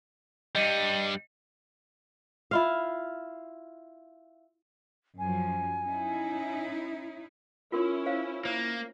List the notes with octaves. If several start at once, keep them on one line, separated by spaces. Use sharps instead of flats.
G2 G3 D#5 C#7 D#7
E4 F4 F5
F#2 F3 G#5
C#4 D#4 E4
C#4 E4 F4 A#4 C6
C5 C#5 F5
A#3 C5